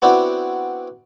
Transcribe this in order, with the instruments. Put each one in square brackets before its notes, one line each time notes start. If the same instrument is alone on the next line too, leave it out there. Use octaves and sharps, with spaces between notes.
[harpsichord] B3 C4 D4 E4 F#4